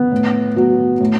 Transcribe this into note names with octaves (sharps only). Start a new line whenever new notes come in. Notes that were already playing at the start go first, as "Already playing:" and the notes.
Already playing: B3
A2
F#3 B3
A2